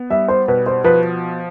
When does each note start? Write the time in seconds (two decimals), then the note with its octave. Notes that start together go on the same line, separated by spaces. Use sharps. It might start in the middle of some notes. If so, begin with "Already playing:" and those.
Already playing: B3
0.10 G3 E5
0.28 C5
0.48 B2 B4
0.66 C5
0.84 F3 B4